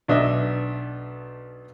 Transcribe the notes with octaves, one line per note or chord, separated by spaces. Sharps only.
B1 D4 D#5 E5